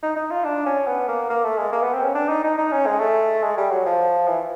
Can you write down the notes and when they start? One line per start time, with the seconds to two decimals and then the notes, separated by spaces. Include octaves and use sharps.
0.03 D#4
0.16 D#4
0.31 F4
0.45 D4
0.66 C#4
0.87 B3
1.08 A#3
1.30 A#3
1.44 A3
1.58 G#3
1.72 A#3
1.83 B3
1.94 C4
2.04 C#4
2.15 D4
2.29 D#4
2.44 D#4
2.58 D#4
2.72 C#4
2.86 G#3
3.00 A3
3.43 G#3
3.57 G3
3.71 F#3
3.86 F3
4.28 E3